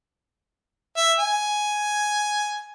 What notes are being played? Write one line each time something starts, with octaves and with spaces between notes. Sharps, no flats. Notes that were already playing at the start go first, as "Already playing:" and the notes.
E5
G#5